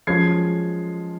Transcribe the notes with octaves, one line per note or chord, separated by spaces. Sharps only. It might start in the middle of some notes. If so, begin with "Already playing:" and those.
F3 G#3 C#4 G#6 C7